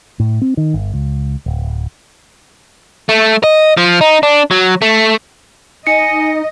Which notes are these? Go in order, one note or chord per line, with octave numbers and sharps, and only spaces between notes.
A2
C4
D#3
G1
C#2
D1
A3
D#5
F3
D#4
D4
F#3
A3
D#4 D#5 G#5 C#7